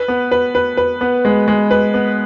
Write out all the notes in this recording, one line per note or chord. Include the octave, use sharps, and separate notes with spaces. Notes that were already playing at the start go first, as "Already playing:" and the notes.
Already playing: B4
B3
B4
B4
B4
B3
G#3
G#3
B4
B3